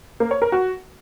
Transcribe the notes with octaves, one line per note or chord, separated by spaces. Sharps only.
A#3
C#5
A#4
F#4